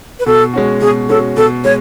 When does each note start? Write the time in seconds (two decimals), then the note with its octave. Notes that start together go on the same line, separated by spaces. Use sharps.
0.20 B4
0.26 B2 A4
0.54 G#3 C#4 F#4
0.81 B2 G#4
1.09 G#3 C#4 F#4 A4
1.37 B2 A4
1.64 G#3 C#5